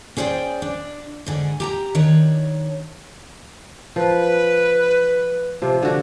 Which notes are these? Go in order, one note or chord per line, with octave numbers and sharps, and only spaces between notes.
C#4 G#4 C5 D5 G5
D4
G#2 D3 G#4
G4 A5 A#5
D#3 D4 C#5
F3 B4
C3 F3
D3 F#4